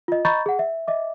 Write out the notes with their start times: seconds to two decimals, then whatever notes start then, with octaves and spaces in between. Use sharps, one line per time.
0.08 F4 D#5
0.25 D#5 A#5 B5 C#6 G6 A6
0.46 G#4 F#5
0.59 E5
0.88 D#5 E5 D6